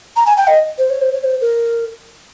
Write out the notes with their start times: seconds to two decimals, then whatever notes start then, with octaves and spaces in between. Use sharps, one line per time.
0.16 A#5
0.26 G#5
0.37 G5
0.47 D#5
0.78 C5
0.90 C#5
1.01 C5
1.13 C#5
1.24 C5
1.41 A#4